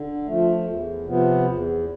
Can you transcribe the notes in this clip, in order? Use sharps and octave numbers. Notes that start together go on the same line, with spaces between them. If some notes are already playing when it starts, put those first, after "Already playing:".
Already playing: D3
F3 A3
E2
C3 F3 B3
E2